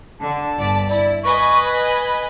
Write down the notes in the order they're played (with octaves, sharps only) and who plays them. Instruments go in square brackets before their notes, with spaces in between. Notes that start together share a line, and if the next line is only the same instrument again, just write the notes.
[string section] D3 [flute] A5
[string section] G1 D5 B6
[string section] E4 [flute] D5
[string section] B4 D#5 G#5 [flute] C#6
[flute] B5